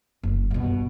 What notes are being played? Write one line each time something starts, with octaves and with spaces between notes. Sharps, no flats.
F#1
G2 B2